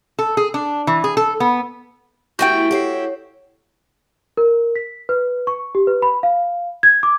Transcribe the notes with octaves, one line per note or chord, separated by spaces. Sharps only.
A4
G#4
D4
E3
G#4
A4
B3
E3 A3 B3 F#4 G4 E5 G5 G6
E4 G4 A4 C#5 C7
C#5
A#4
B6
B4
C#6
G4
B4
B5
F5
G#6
D6